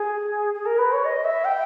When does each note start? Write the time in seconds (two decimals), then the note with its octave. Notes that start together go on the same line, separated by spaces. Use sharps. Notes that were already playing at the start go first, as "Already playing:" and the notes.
Already playing: G#4
0.54 G#4
0.66 A#4
0.78 B4
0.92 C#5
1.05 D#5
1.24 E5
1.44 G5